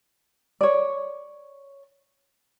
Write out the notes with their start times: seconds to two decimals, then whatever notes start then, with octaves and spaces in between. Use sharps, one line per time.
0.61 C#5 D5